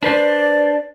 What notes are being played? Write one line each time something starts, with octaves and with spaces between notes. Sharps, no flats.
D4 B4 C5 D5